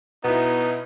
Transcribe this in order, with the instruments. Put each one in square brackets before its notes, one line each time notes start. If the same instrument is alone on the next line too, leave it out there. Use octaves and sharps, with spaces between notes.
[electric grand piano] B2 E4 [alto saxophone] B3 [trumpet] D#4